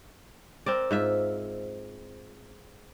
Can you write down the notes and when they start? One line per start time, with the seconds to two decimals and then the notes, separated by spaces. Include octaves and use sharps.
0.66 C4 A#4 D5
0.91 G#2 F4 E5